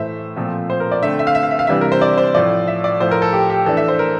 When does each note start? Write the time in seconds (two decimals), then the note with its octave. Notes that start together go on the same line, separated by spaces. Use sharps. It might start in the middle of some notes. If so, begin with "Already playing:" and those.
Already playing: A2 E3 A3 C5 E5
0.36 A#2 F3 A3 C4
0.70 C5
0.80 A#4
0.92 D5
1.03 D3 A3 C4 E5
1.19 E5
1.27 F5
1.35 E5
1.43 F5
1.51 E5
1.59 F5
1.67 C3 E3 G3 D4 E5
1.81 A#4
1.92 C5
2.02 D5
2.18 C5
2.35 A2 F3 A3 D5
2.68 E5
2.84 D5
3.00 A2 F3 A3 C5
3.11 A#4
3.22 A4
3.33 G4
3.50 G4
3.66 E3 A3 D4 A4
3.77 E5
3.88 C5
3.99 A#4